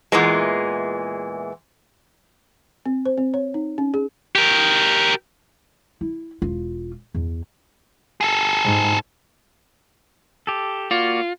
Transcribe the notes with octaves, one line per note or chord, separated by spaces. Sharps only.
E2 A#2 E3 G#3
C4
C5
C4
C#5
D#4
C#4
G#4
G4 A#4
E4
E1 F4
E2
G#4 A4
G#2
G4 A4
A#3 F4 F#4 D5